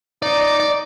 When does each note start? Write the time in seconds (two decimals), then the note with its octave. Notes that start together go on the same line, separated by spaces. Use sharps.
0.22 D#4 D5
0.41 D5
0.60 D5